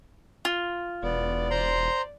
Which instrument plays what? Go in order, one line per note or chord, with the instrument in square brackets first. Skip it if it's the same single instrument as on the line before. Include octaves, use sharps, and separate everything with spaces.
[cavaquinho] F4
[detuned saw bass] E1 [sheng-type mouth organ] B3 [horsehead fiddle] D5
[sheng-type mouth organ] C5 A#5 C6